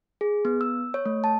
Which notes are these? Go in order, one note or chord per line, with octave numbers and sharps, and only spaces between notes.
G#4
B3
E6
C#5
A3
A5